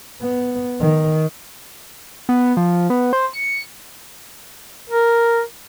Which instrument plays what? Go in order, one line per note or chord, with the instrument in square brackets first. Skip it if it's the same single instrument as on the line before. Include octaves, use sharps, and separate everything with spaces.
[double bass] B3
D#3
[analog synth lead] B3
F3
B3
C5
C#7
[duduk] A#4